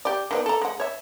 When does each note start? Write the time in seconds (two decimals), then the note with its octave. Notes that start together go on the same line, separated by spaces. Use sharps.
0.05 G4 D5
0.31 D#3 B3 D5
0.46 A4 A#5
0.62 G#3 F#5
0.80 C#5 E5